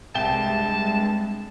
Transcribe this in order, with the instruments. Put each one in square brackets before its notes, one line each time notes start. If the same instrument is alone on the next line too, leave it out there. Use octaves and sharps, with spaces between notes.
[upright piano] C2 G5 G7 [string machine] G2 G#3 [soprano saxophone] A5